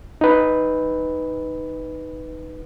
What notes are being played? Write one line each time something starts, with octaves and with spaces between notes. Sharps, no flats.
D#4 B4